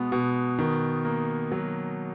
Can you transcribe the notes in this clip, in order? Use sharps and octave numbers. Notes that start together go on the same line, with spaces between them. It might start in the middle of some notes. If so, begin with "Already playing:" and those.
Already playing: B2 G#3 B3
B2
D#3
A#3
F#3